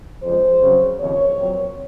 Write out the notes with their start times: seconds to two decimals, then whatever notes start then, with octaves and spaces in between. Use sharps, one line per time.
0.23 F2 C#3 F3 G#3 C5
0.61 C#3 F#3 C4
0.99 D#2 C#3 F3 C4 C#5
1.37 A#2 F#3 C4